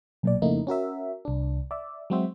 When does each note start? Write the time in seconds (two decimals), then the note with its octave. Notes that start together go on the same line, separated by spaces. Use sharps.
0.23 B1 A#2 D5
0.42 F2 C#3 A3 A#3 D#4 E4
0.67 C#4 F#4 A#4 E5
1.25 C2 D4
1.71 D5 E5
2.10 F#3 G#3 C4 F#4 C5 E5